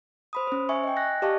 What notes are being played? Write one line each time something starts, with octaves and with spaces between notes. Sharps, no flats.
C5 B5 D#6
C#4 C5
E5 G#5 C#6
D#5 G5
G#5 F#6 A#6
G4 D5 D#5 F5 A5 C#6